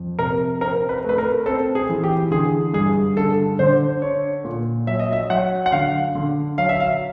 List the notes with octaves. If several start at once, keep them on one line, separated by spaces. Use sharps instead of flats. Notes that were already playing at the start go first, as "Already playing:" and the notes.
Already playing: F2
C3 A#4
C4 A#4
B4
A3 B4
A#4
C4 A4
G#4
E3
G4
D3 G#4
G2 G#4
D3 A4
D3 C5
D4 C#5
A#2
F#3 E5
D#5
E5
F#3 F#5
F#5
D3 F5
D3
F#3 F5
E5
F5